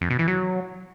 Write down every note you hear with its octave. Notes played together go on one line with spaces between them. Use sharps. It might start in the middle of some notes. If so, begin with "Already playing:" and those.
F2
B2
E3
F#3